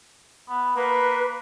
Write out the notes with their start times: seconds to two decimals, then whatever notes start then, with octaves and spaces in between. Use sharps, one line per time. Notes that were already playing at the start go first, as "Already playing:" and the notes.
0.49 B3
0.76 A#3 B4